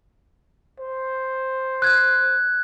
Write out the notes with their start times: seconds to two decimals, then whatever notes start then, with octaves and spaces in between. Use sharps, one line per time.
0.79 C5
1.82 F#6 G#6